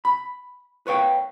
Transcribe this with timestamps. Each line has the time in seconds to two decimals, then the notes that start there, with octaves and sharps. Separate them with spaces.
0.05 B5
0.87 B4 C#5 F5 G5